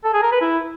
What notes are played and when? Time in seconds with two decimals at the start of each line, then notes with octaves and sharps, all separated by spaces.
0.05 A4
0.14 G#4
0.23 A#4
0.32 B4
0.41 E4